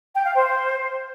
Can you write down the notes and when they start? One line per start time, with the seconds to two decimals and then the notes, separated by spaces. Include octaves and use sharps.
0.15 G5
0.25 F5
0.35 C5